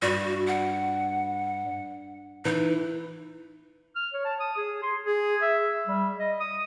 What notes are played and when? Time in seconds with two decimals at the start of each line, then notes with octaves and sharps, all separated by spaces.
0.02 G2 F#4
0.47 F#5
2.45 E3 D#4
3.96 F6
4.13 C#5
4.25 A5
4.40 D#6
4.57 G#4
4.83 C6
5.04 G#4
5.42 E5
5.87 G3
6.18 D#5
6.40 D#6